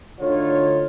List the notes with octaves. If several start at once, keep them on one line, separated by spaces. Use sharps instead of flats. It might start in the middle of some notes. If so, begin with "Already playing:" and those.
D2 D3 D#4 F4 C#5